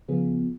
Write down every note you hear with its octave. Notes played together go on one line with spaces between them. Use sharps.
C#3 F3 B3 F4 G#4